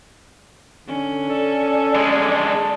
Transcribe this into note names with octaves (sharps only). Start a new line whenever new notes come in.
D3 C#4
A4 D5
D3 G#3
A5